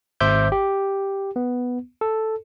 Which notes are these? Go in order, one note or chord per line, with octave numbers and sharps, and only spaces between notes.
G#1 C5 E5 D6 G6
G4
B3
A4